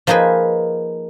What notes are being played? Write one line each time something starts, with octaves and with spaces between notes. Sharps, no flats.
F3 A#3 D#4 G#4 B4